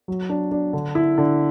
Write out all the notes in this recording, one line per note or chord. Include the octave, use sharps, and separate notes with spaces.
F#3
D4
D4
D3
E4
D3